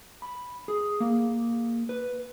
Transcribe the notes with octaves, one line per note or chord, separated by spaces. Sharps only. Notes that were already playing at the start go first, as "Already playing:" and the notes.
B5
G#4
A#3
B4